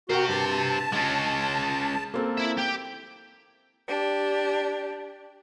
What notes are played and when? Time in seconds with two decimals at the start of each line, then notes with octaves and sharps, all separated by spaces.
0.09 F#4 G4 A#4 C5 G5
0.29 G2 A5
0.92 G#3 C#4 A6
2.14 A#3 C4 A4
2.37 E4 E5
2.57 G4
3.87 D4 G4